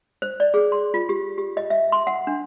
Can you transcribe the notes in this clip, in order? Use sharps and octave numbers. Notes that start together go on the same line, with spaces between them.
C5
D5
G#4
C6
F4
G4
G4
D#5
E5
C6
F#5
D4